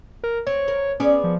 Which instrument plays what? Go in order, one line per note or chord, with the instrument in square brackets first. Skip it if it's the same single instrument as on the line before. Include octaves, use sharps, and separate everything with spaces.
[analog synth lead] A#4
[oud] C4 [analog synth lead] C#5
[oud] A#4
[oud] B3 G#4 D5 [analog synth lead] C#4
[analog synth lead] F3